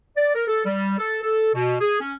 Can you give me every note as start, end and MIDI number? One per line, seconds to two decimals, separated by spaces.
0.17 0.31 74
0.34 0.46 70
0.48 0.63 69
0.65 0.95 55
0.98 1.19 69
1.23 1.52 69
1.54 1.76 47
1.81 1.97 68
2.01 2.14 61